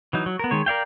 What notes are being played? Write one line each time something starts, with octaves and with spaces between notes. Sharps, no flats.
E3 F#3 D#4
F#3
B3 A#4
D#3 G#3 C#5
A#4 D5 F5 G5